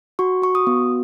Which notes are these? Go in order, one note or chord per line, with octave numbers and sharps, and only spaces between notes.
F#4 C#6
F#4 C#6
D#6
B3